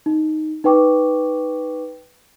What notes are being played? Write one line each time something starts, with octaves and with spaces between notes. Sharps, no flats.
D#4
D#4 B4 G5 C#6 D6